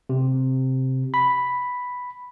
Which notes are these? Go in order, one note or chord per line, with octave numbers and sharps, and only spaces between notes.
C3
B5